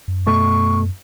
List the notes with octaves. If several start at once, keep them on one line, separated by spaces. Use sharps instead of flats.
F#2
B2 A3 C#6